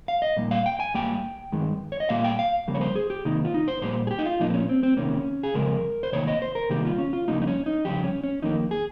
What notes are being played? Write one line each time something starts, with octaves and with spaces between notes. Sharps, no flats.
F5
D#5
A#2 G3 A#3
F5
G5
G#5
G#2 G3 A#3 G5
G2 D#3 G#3
C#5
D#5
A#2 G3 A#3 F5
G5
F5
F2 C#3 G3 A#3
C#5
C5
G#4
G4
C3 D#3 A#3 D#4
F4
D#4
C5
A#2 G3 A#3 C5
G#4
G4
D#4
F4
A#2 F3 A#3 D#4
C4
C#4
C4
C4
C3 D#3 A#3 C#4
G#4
F2 C#3 G#3 A#4
C5
C3 D#3 A#3 C#5
D#5
C5
A#4
C3 D#3 G3 A#3 G4
F4
C#4
F4
F2 C#3 G3 A#3 D#4
D#4
C#4
D#4
F2 C#3 G3 G4
C#4
C#4
F2 D#3 A#3 D#4
G#4